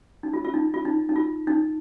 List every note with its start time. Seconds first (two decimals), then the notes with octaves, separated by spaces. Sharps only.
0.23 D#4
0.33 F4
0.44 F4
0.54 D#4
0.74 F4
0.85 D#4
1.09 D#4
1.16 F4
1.47 D#4